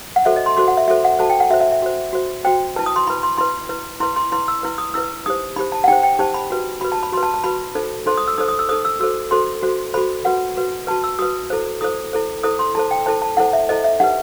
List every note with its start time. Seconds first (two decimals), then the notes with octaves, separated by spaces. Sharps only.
0.16 F#5
0.25 F#4 A4 C5 E5
0.36 D#5
0.46 C6
0.57 F#4 A4 C5 C6
0.68 F#5
0.77 E5
0.88 F#4 A4 C5 E5
1.05 F#5
1.19 F#4 A4 C5 A5
1.30 G5
1.40 F#5
1.50 F#4 E5
1.54 C5
1.61 E5
1.72 E5
1.82 F#4 C5
2.13 F#4 C5
2.45 F#4 C5 G5
2.76 E4 B4 A5
2.86 D#6
2.96 C6
3.07 E4 B4 B5
3.23 C6
3.38 E4 B4 C6
3.69 E4 B4
4.00 E4 B4 C6
4.16 C6
4.32 E4 B4 C6
4.48 E6
4.63 E4 B4
4.78 D#6
4.94 E4 B4 E6
5.26 D#4 G4 C5 D#6
5.56 D#4 G4 C5 B5
5.72 A5
5.84 F#5
5.88 D#4 G4 C5 G5
6.03 G5
6.19 D#4 G4 C5 A5
6.34 B5
6.51 F#4 B4
6.81 F#4 B4 B5
6.92 A5
7.03 B5
7.12 F#4 C6
7.17 B4
7.23 A5
7.34 A5
7.44 F#4 B4 B5
7.75 D#4 A4 C5
8.06 D#4 A4 C5 C6
8.17 D#6
8.28 E6
8.38 D#4 A4 C5 D#6
8.48 D#6
8.59 E6
8.69 D#4 A4 C5 D#6
8.85 E6
9.00 F#4 A4 C5 E6
9.31 F#4 A4 C5 C6
9.63 F#4 A4 C5
9.94 F#4 A4 C5 B5
10.25 F#4 B4 F#5
10.57 F#4 B4
10.87 F#4 B4 A5
11.04 E6
11.19 F#4 B4 D#6
11.50 E4 A4 C5
11.81 E4 A4 C5 D#6
12.13 E4 A4 C5
12.43 E4 A4 C5 D#6
12.59 C6
12.75 E4 A4 C5 A5
12.91 G5
13.06 E4 A4 C5 A5
13.22 A5
13.37 E4 A4 C5 F#5
13.53 E5
13.69 E4 A4 C5 D#5
13.84 E5
14.00 D#4 G4 B4 F#5